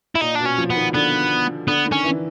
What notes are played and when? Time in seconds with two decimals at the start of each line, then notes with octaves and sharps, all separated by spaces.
0.16 E4
0.21 A#2 D#4
0.35 B2 D4
0.46 C#4
0.58 F3
0.70 B3
0.76 D#3
0.94 D3 B3
1.67 D3 B3
1.86 D#3
1.92 C#4
2.04 E3